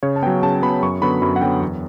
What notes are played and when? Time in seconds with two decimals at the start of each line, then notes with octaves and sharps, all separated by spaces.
0.03 C#3 C#5
0.16 A5
0.22 F#3 B3 G5
0.43 C#3 A5
0.62 F#3 B3 B5
0.83 F#2 C#6
1.02 D3 F#3 B3 B5
1.22 F#2 B5
1.36 F#5
1.41 D3 F#3 B3 G5
1.61 E2